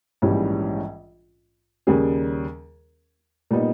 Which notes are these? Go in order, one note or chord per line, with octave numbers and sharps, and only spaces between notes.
A#1 G#2 E3 G3 C#4
D#2 C#3 G3 C#4 G#4
A#2 G3 B3 D#4